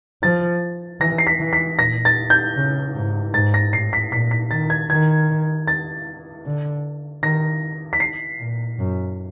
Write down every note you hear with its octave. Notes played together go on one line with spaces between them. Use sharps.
F3 A6
E3 A#6
C7
B6
E3
B6
A#2 A#6
A6
G6
C#3
G#2
G#2 A6
A#6
A2 C7
B6
A#2 B6
B6
D#3 A6
G#6
D#3 G#6
A6
D3
D#3 A#6
B6
C7
A#2
F#2